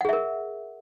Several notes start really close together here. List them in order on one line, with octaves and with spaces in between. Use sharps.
F#5 G#4 E5 A#4